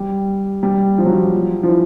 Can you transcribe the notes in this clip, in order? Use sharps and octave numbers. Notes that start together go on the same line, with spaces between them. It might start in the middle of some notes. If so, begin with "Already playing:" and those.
Already playing: G3
G3
F3
F#3
F3
F3
E3